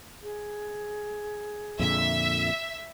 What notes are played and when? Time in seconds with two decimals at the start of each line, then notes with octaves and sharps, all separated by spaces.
0.23 G#4
1.79 F2 A#2 D3 E5